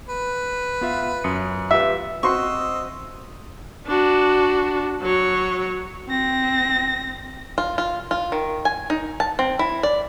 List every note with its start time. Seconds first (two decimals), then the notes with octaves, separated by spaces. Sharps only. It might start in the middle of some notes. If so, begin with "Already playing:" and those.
0.08 B4
0.81 B3 F4 E5
1.24 F#2 D#6 C#7
1.71 F4 G4 B4 E5
2.23 C4 F#4 D#5 C6 C#6 E6
3.86 D4 F#4
5.01 F#3 C#5
6.09 C4 A#6
7.58 F4
7.78 F4
8.11 F4
8.32 D#3
8.65 G#5
8.90 D#4
9.20 A5
9.39 C4
9.59 E4
9.83 D5